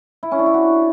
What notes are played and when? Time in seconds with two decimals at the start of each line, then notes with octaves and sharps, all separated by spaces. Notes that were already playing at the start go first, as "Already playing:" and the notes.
0.23 E4
0.32 C#4
0.39 D4
0.46 E4
0.54 F#4